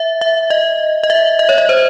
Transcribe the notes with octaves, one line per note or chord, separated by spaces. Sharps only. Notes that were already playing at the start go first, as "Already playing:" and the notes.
Already playing: E5
E5
D#5
D#5
E5
D#5
C#5
D#5
C5